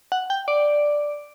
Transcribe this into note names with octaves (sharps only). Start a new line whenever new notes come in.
F#5
G5
D5